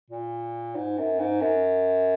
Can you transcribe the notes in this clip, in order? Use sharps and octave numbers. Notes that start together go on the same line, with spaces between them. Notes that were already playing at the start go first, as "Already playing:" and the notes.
A#2
G#2
F#2
G#2
F#2